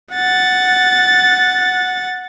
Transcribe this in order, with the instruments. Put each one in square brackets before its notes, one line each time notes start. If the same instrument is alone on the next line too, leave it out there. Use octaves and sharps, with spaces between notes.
[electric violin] F#5 A6